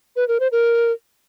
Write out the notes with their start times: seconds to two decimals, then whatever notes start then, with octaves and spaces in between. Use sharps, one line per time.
0.16 B4
0.28 A#4
0.40 C5
0.52 A#4